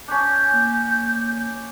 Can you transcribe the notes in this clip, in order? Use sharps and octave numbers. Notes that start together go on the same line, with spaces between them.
C#4 D4 G6
A#3